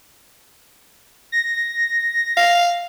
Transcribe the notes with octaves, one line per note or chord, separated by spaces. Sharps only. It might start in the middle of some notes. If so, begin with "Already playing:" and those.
A#6
F5